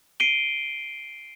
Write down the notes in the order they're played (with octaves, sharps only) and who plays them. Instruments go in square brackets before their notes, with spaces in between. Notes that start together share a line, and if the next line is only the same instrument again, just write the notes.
[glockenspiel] C7 D7 D#7 G7